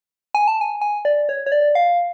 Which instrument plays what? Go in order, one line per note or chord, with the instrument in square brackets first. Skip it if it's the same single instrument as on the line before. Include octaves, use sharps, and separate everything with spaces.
[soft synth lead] G#5
A5
G#5
G#5
D5
C#5
C#5
D5
F5